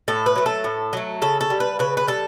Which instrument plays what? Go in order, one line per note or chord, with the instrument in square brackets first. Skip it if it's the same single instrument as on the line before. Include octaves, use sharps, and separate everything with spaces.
[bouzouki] A2 A4
B4
F#3 A3
A4
A2
F#3 A3
C#3 A4
A4
G3
B4
C#3 B4
B4
G3 A4